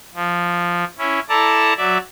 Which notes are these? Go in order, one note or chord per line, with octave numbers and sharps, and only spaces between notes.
F3
C#4 E4
E4 A4 D5 A5 A#5
F#3 D5 E5